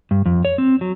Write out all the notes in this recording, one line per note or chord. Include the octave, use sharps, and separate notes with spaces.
G2
F2
C#5
C4
F#3